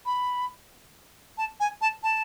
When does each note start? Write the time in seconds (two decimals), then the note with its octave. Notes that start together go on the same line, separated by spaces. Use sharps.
0.06 B5
1.38 A5
1.60 G#5
1.81 A5
2.03 A5